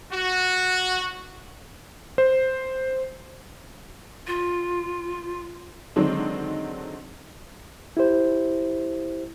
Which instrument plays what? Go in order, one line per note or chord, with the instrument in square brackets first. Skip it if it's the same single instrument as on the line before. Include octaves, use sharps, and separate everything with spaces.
[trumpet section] F#4
[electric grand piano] C5
[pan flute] F4
[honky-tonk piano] D3 D#3 F#3 G#3 C4 D4
[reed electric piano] E4 G4 C5